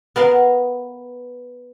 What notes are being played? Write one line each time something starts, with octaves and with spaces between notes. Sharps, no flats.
B3 A#4 F5